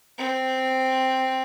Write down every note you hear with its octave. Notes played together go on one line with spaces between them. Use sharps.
C4